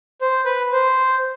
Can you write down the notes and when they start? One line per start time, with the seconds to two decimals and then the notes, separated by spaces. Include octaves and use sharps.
0.21 C5
0.45 B4
0.72 C5